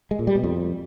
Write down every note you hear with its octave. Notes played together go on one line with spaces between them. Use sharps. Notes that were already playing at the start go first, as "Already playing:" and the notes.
G#3
A#2
G3
B2
F2